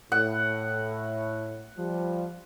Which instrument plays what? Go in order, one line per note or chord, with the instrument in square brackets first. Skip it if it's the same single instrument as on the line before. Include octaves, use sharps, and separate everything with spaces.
[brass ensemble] A2 [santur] F#5
[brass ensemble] F3 G3